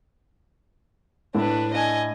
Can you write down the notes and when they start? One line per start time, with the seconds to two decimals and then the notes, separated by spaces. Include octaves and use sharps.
1.35 A2 D4 B4
1.74 D#5 G#5